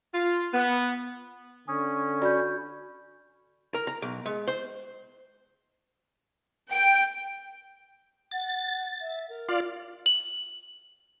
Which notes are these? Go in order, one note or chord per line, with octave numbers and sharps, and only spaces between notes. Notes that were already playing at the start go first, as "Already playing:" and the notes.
F4
B3
D3 C#4 D#6
F#4 D5 B5 G6
A#4
A#5
B1
G#3
C5
G5
F#5 A6
E5
A#4
F4 D5 F5
F#7